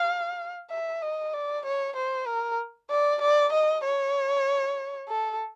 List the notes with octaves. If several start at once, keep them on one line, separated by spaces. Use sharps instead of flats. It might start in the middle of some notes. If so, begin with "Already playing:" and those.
Already playing: F5
E5
D#5
D5
C#5
C5
A#4
D5
D5
D#5
C#5
A4